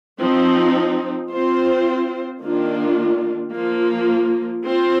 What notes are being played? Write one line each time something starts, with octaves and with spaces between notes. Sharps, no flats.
F3 C4 D#4
C4 F4 C5
D#3 A#3 D4 F4
F3 A#3 F4
C4 F4 C5